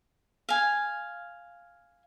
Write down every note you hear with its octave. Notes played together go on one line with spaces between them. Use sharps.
F5 G#5